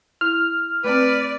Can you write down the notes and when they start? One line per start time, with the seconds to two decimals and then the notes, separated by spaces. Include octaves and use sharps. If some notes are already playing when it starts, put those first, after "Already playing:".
0.21 E4 F6
0.84 A3 C4 B4 D5